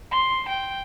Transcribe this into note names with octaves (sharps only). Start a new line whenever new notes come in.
C6
G5